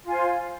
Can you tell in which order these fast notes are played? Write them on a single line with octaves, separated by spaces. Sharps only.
F4 G#5 C5